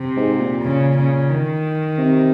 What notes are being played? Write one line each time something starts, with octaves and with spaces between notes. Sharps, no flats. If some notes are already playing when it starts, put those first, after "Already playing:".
Already playing: C3
G#2
A#2
C#3
C#3
D#3
C3